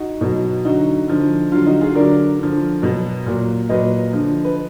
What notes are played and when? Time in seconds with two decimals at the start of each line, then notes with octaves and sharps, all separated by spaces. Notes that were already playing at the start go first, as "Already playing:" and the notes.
Already playing: D#4 F#4
0.21 B2 F#3
0.65 D3 F#3 D#4 F#4
1.08 D3 F3
1.52 D3 F#3 F4
1.66 D#4 F#4
1.81 F4 G#4
1.95 D3 F#3 A#4 D5
2.39 D3 F3
2.82 B2 F#3
3.26 A#2 F#3
3.69 A#2 F#3 B4 D#5
4.13 D3 F3
4.45 B4